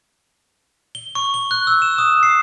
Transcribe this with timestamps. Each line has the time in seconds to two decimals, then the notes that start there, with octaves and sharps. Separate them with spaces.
0.95 G7
1.15 C#6
1.34 G7
1.51 F#6
1.67 E6
1.82 E7
1.98 D#6
2.23 C7